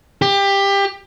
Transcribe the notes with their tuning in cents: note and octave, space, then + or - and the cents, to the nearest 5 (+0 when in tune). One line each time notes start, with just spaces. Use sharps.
G4 +20